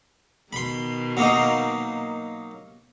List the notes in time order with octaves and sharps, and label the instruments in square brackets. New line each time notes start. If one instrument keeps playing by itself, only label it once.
[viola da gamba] B2 D#3 [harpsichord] B5 C6
[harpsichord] F#3 A#3 D#4